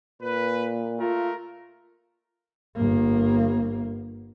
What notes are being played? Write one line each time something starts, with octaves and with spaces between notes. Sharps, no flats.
A#2 B4
A3 F4 A#4
G1 A#3